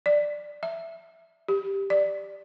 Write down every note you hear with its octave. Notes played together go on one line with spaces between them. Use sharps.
D5
E5
G4
D5